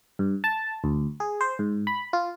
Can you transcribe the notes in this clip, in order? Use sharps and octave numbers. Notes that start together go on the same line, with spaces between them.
G2
A5
D2
G#4
C5
G#2
B5
F4